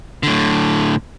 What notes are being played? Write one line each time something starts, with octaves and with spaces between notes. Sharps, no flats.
A2 D3